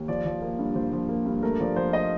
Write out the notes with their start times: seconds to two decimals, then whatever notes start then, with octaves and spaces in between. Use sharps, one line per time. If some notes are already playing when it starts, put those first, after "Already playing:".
Already playing: D#2
0.08 F3 D5
0.25 F3
0.42 A#3
0.59 G2
0.75 F3 C5
0.93 F3
1.09 A#3
1.26 G2
1.43 A3 A#4
1.60 F3 D5
1.76 F3 C5
1.93 D#5